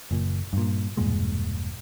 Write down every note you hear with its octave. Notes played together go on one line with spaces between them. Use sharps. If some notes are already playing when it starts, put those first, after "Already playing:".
F#1 A#2
G2 A#2
E1 G2 A#2 G#3